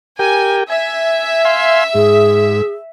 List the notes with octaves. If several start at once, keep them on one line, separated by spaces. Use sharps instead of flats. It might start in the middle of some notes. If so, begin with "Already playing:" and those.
G4 A#4 G5 G#5
E5 G#5
F5 G#5 C6
G#2 G#4